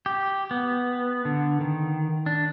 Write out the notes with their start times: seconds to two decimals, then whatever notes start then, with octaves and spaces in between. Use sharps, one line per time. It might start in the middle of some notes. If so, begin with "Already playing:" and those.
0.06 G4
0.51 B3
1.25 D3
1.61 D#3
2.26 D4